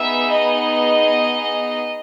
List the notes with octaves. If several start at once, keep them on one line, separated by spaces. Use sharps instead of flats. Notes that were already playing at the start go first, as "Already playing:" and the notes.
Already playing: B3 D#4 G#4 E5
D#5